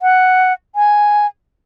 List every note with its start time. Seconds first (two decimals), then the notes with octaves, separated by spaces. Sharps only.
0.02 F#5
0.75 G#5